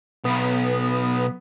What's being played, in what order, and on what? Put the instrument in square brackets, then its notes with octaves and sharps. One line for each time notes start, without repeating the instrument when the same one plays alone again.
[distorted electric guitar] B1 [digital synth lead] B3